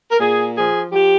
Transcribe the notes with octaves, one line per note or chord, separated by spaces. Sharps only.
A#4
A#2 G#4
F3 G#4
F3 G4